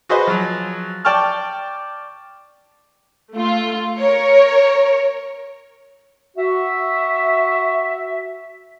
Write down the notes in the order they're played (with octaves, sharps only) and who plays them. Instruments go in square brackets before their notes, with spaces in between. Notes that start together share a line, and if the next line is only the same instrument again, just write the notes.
[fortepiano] F#4 G#4 B4 C5 D#5
F3 F#3
D5 G5 A5 C#6 F6
[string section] A3 F4
A#4 C#5
[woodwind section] F#4 E5